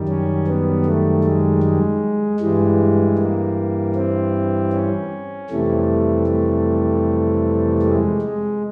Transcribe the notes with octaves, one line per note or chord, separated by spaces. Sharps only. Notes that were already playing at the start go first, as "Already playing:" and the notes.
Already playing: F#2 D#3 G3
C#4
B3
A3
G#3
G#3
G2 E3 G3 G#3
A#3
C4
C#4
F2 C3 E3 G3 A3
A3
G#3
G#3